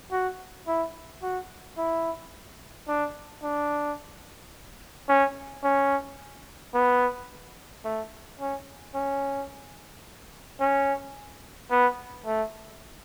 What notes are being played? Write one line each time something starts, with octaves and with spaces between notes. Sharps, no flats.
F#4
E4
F#4
E4
D4
D4
C#4
C#4
B3
A3
C#4
C#4
C#4
B3
A3